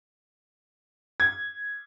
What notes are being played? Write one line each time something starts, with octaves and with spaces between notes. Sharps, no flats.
G#6